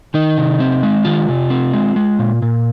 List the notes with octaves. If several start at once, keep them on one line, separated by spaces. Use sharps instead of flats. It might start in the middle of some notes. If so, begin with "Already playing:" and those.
D#3 D#4
C3
C4
G#3
D#3 F4
C3
C4
G#3
G#3
A#2
A#2